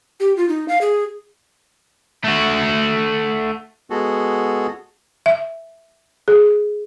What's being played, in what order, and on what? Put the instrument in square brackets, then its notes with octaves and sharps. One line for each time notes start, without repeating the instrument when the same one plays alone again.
[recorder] G4
F4
D#4
F5
G#4
[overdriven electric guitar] A3 F#4
[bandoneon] G#3 B3 F#4 G#4 A4
[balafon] E5
G#4